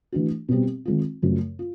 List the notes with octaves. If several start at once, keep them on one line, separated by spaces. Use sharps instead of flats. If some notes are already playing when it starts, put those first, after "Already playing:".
E3 A3 D4 F#4
B2 G3 C4
D#3 G#3 C4 F4
F#2 C#3 F3 A3
F4